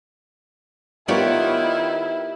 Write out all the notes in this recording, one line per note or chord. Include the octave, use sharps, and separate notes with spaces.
D#3 B3 E4 F4 G4 A#4 C#5 D5